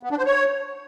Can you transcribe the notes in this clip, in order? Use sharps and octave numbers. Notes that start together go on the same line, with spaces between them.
B3
D4
C5
C#5